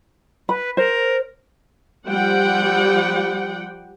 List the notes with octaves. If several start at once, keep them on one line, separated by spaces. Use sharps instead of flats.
B4 B5
A#4 C5
F3 G3 F#5 G5